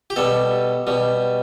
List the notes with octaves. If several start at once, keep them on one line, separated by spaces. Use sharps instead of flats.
G4
B2 G3 A4
B2 G3